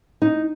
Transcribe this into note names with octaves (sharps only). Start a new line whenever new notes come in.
D#4